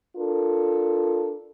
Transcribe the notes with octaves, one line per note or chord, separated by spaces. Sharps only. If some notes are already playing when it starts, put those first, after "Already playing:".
D4 F4 A4 A#4